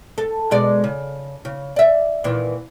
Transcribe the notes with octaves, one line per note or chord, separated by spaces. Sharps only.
A4
B2 G#3 D5
C#3
C#3
D5 E5
A#2 D#3 E3